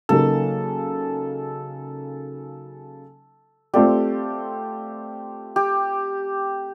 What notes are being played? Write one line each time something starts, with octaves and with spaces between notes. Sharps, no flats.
C#3 F#3 A#3 D#4 F#4 A4
A3 C4 F4 G4 A4 D5
G4